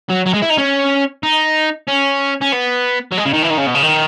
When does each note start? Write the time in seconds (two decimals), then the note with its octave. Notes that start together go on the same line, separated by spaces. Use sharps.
0.09 F#3
0.26 F#3
0.33 G#3
0.42 E4
0.49 D#4
0.58 C#4
1.23 D#4
1.88 C#4
2.42 C#4
2.53 B3
3.12 F#3
3.18 G#3
3.25 C#3
3.33 D#3
3.42 E3
3.50 D#3
3.57 C#3
3.66 B2
3.75 C#3
3.82 D#3